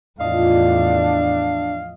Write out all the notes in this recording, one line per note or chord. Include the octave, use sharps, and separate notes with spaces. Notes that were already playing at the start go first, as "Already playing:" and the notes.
E2 A2 F3 D4 D#5 F5